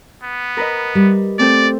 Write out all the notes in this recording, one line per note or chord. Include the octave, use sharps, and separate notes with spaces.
B3
A#4 B4 D#5
G3
A3 C4 A4 D5